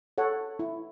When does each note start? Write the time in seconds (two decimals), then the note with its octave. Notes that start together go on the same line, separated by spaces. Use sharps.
0.18 A4 C#5 F#5
0.59 E4